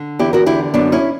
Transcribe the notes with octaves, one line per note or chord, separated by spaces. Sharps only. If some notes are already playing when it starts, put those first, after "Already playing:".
Already playing: D3
E2 E4 G4
F#4 A#4
D3 E4 G4
F#2 B3 D4
C#4 E4